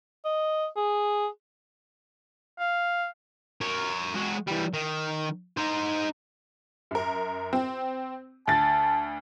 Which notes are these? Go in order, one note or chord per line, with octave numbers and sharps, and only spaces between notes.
D#5
G#4
F5
A#4 C#5
G#3 F#4
E3 G3
D#3
D#4 C5
F#2 A#4
C4
D2 A5 A6